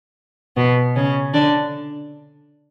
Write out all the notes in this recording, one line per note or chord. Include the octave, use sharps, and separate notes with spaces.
B2 B3
C#3 C#4
D3 D4